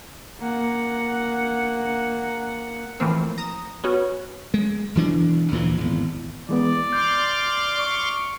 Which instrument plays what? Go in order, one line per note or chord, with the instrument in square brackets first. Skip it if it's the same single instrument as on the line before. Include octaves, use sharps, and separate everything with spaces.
[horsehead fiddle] A#3 F#5
[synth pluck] A2 E3 F3 A#3 C4
A#5 D#6 E7
B3 C#4 F#4
[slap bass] G#3
E1 E3 D4
D2 A#2 E3 F3
G#1 E2
[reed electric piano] E3 G#3 B3 [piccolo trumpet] D5
[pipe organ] C6 D6 F6 [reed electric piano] G6
[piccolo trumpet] C#6